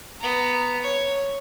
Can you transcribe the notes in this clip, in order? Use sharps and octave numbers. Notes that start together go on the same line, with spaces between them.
B3 A#5
C#5